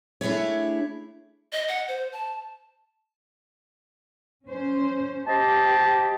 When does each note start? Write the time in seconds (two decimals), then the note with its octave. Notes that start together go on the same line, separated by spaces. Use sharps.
0.21 A3 D4 E4 G#4 C#5
1.53 D#5
1.68 F#5
1.88 C5
2.12 A5
4.46 C#4 C5
5.27 G4 C5 D#5 A5